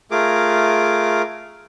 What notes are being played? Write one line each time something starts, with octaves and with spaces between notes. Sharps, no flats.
A3 F4 G#4 A#4 D6